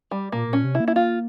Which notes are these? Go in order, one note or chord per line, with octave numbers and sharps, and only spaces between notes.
G3
A#2 A#3
A#2
C#4
C3
E4
A#3
E4
F4